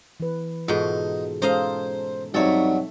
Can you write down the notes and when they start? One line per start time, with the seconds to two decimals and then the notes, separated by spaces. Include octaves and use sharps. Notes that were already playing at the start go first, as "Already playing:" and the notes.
0.20 E3 B4
0.68 G#2 B2 D#4 F4 F#4 A4
1.42 G#3 C#4 D#4 A4 C5 D#5 F5
2.34 G2 F3 F#3 C4 D#4 A4 C#5 E5